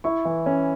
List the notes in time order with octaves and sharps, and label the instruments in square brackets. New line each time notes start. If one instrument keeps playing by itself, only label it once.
[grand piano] E4 C#6
E3
C#4